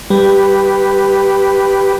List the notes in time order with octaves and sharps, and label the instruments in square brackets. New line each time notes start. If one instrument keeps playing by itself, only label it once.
[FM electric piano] G3 [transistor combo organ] G4 B4